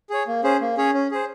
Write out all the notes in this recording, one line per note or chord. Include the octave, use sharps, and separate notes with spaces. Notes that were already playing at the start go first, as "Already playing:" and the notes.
G#4 C#5
A#3
C#4 G#4 C5
A#3
C#4 G#4 C#5
C#4
G#4 C5